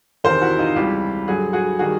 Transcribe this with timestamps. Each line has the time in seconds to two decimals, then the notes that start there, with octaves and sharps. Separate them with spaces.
0.24 E2 C3 D#3 A#4 C5
0.42 E4 F#4
0.59 D#4 F4
0.76 C#2 C3 E3 G3 F4 G4
1.28 G2 D3 F#3 F#4 G#4
1.53 F#4 G#4
1.79 D#3 G3 F#4 G#4